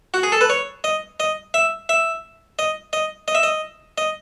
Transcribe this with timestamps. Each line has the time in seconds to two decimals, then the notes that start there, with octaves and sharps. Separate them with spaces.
0.14 F#4
0.23 G#4
0.32 A4
0.41 B4
0.50 C#5
0.84 D#5
1.20 D#5
1.54 E5
1.89 E5
2.59 D#5
2.93 D#5
3.28 D#5
3.35 E5
3.43 D#5
3.98 D#5